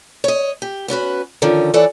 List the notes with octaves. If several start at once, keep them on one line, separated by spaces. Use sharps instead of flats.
C#5 D#5
G4
B3 C#4 F#4 B4
D3 D#3 F3 C#4
E3 A4 C#5 D5 F#5